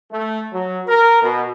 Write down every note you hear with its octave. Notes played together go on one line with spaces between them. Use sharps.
A3
F#3
A#4
B2